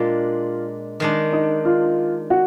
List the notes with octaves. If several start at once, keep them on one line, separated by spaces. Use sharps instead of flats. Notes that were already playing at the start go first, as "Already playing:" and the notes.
Already playing: A#2 G#3 D4 F4
D#3 G#3 D4
D#4
F4
F#4